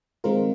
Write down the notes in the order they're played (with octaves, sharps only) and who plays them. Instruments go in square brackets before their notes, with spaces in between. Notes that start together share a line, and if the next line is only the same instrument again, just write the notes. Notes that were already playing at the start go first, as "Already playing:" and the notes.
[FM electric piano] D#3 G#3 C4 F4 A#4